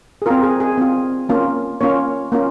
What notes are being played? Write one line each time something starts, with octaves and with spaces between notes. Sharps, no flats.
G#4
C4 F4 A#4
G#4
G#4
C4 F4
A#3 C#4 F4
A#3 C#4 F4 C#5
A#3 C#4 F4